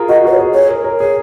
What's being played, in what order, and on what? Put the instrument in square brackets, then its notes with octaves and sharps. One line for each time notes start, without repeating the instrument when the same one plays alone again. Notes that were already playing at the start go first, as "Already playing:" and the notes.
Already playing: [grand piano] F4 G#4 A#4
[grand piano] F#4 [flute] D#5
[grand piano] F#4 [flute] B4
[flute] C#5
[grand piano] G#4
[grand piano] G#4 [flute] C#5
[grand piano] A#4
A#4
[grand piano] G#4 [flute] C#5